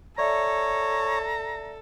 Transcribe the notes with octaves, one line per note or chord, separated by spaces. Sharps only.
A4 C#5 D5 E5 A#5